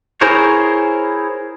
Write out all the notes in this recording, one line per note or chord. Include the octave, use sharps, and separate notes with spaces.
E4 G#4 A#4 C5 C#5